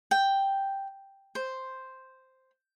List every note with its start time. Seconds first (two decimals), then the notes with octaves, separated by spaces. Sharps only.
0.11 G5
1.35 C5